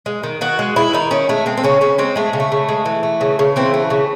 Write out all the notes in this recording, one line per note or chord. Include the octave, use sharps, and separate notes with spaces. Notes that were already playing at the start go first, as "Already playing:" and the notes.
G#3
D#3
D#3 F#4
G#3
G#3 E4
D#3 D#4
D#3 C#4
G#3 A3
G#3 C4
C4
C#3 C#4
C#3 C#4
G#3 C4
G#3 A3
C#3
A3
C#3
G#3
E3
A3
C#3
C#3
E3 C4
A3
C#3